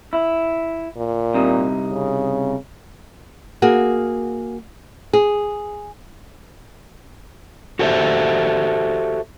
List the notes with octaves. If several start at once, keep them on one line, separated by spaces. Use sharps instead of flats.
E4
A#2
C2 C3 D#4
C#3
A#3 F#4 G#4
G#4
F#4 G4 A4 C5 D#5 E5